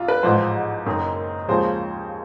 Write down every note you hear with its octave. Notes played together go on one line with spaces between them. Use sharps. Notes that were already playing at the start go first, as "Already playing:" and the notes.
Already playing: C2 F4
B4
A1 G#2 F3 C5
F#1 F#2 D#3
D#2 C#3 F3 G#3 C5